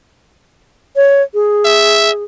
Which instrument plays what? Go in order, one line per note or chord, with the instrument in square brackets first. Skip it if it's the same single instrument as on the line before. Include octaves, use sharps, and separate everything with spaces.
[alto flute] C#5
G#4
[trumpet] E5